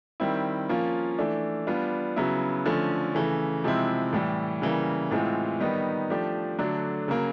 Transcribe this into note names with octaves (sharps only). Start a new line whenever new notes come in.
D#3 G3 C4 E4
F3 A#3 C#4 F4
E3 A3 D4
G3 B3 D4 F4
C#3 F#3 B3 E4
D3 F3 A3 C#4
C#3 E3 A3
C3 F3 G#3 C4 E4
A2 E3 G3
C#3 E3 G3 A#3
A2 E3 G#3 C4 F4
D#3 G3 B3 D#4
F3 A3 D4 G4
D3 F#3 A3 D4
C#3 F#3 A#3